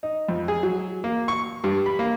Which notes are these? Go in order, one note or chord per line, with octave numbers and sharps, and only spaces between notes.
D#4
F2
G#4
F#3
A#3
C#6
G2
B5
A#3